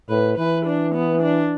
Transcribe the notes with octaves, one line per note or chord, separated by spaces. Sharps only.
A2 B4
E3 B4
D4
B3
D4